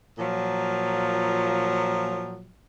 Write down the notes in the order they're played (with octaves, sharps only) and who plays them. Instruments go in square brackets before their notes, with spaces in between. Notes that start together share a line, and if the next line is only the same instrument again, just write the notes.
[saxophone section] A#2 F3 F#3